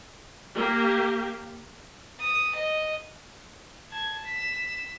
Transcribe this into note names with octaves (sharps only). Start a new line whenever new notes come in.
A#3 G4
D#6
D#5
A5 G#6
B6 E7